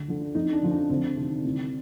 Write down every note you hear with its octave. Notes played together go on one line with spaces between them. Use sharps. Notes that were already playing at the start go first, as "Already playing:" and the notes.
Already playing: D2
D3 F3
F2 D#4
D4
D3 F3
D4
D2 C4
C3 D#3
C2